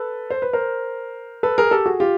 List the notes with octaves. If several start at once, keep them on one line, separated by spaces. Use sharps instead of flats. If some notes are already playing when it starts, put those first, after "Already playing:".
Already playing: A4 B4
C5
B4
A#4 C5
A4 B4
G#4 A#4
G4 A4
F#4 G#4
F4 G4